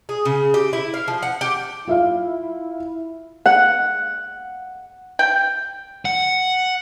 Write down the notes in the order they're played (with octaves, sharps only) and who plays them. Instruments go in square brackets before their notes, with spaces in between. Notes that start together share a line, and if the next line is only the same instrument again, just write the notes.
[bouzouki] G#4
C#3
G4
E4
F5
F3
F#5
G4
[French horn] E4 [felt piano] F4 E5 F5
[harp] F#5
[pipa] G5
[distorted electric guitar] F#5